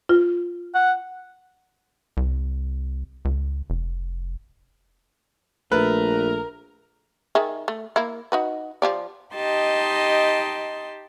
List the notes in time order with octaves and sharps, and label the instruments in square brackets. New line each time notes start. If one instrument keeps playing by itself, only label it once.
[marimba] F4
[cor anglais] F#5
[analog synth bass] C2
C#2
F1
[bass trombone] A#1 [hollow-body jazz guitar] A3 [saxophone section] A#4 [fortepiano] B4
[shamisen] D#3 G#4 E5
A3
A#3 E4
D#4 F#4 B4
F3 G4 D5
[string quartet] D#4 G4 D#5 A5 C6